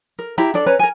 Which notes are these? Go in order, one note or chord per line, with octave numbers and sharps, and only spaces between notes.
A#4
E4 G4 G5 A#5
D4 A4 D5
C#4 B4 A#5
A#4 G#5